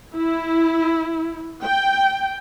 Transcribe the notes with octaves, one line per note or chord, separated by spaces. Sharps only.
E4
G5